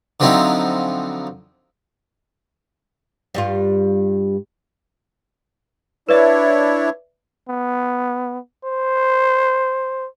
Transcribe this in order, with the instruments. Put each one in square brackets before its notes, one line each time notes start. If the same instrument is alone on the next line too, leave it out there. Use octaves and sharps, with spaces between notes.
[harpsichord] D3 F3 F#3 C4 D#4 E4
[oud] G2 G3 F4
[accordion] D4 E4 C#5 [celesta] B4 D5 E5
[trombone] B3
C5